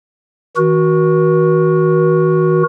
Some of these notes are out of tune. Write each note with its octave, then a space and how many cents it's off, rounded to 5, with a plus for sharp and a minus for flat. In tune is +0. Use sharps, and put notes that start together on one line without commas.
D#3 +45 F#4 +0 A#4 +40